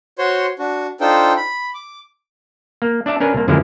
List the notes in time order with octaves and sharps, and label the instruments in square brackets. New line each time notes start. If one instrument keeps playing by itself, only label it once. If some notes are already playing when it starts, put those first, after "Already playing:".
[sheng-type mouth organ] F#4 C5 C#5 C6
D4 F#4
D4 D#4 F4 A4 C5 G5
B5
D6
[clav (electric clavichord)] A#3
D4 D5 E5 A5
C#4 D4 A#4 B4
C2 A#3
F#2 D3 F3 G#3 A#3 E4